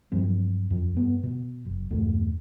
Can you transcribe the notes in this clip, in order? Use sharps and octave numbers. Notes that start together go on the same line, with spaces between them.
G2 F3 F#3 C4
F2
G2 B3
B2
F#1
E2 G2 B2 A3